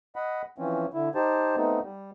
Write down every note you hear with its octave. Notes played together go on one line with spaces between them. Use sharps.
D#5 F#5 B5
E3 F3 C4 C#4
D3 E4
D#4 G4 C5 A5
A3 B3 C4 D#4
G3